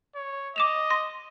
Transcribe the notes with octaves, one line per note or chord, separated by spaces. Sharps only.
C#5
D#5 D6 E7 F7
C6 A#6